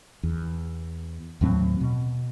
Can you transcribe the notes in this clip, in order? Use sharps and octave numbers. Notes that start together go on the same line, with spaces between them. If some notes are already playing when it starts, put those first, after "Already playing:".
E2
D#2 A2 F#3 C4
B2